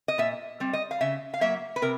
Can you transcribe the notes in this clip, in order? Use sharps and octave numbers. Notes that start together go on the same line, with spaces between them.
D#5
A#2 E5
G3 C4
D#5
F5
C#3 E5
F5
F#3 A#3 E5
B4
C3 A#4